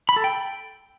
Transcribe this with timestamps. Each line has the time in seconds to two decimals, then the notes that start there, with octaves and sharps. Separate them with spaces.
0.09 B5
0.16 A4
0.24 G5